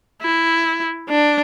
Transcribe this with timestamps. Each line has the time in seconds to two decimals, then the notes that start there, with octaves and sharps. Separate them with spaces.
0.22 E4
1.10 D4